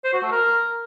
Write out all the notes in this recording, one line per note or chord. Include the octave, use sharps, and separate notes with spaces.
C5
F#4
A3
A#4